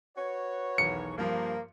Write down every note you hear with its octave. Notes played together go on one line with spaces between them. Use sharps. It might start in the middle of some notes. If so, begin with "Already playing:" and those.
F#4 B4 C#5
B1 E2 D#3 C#7
G2 F3 A#3